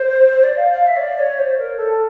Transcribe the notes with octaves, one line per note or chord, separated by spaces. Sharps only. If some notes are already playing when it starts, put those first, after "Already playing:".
Already playing: C5
D5
F5
F5
E5
C#5
D5
C#5
C5
A#4
A4